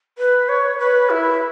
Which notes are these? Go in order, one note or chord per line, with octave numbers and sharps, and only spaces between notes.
B4
C#5
B4
E4